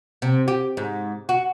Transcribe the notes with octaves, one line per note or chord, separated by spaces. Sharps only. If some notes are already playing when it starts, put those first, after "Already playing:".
C3
G4
G#2
F#4